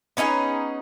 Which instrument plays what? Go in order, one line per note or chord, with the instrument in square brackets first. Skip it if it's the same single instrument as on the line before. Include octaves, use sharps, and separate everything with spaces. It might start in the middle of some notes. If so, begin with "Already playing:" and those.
[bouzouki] B3 C#4 D#4 G#4